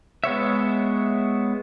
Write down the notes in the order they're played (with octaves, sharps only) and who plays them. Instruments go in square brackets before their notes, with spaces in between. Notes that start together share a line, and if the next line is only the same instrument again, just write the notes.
[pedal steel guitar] G#3 B3 C#5 E5